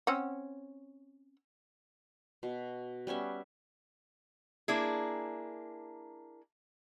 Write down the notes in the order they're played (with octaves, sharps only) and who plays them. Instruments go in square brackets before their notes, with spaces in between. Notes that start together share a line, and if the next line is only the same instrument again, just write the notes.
[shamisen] C4 C#4 F#5
[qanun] B2
G3 B3 C#4 E5
[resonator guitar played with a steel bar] A#3 D4 E4 G#4